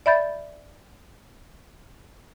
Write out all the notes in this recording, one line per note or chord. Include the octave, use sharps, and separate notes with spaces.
D5 E5 B5 G6 A6